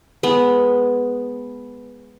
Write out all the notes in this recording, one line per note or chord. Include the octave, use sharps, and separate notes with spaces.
G#3 B3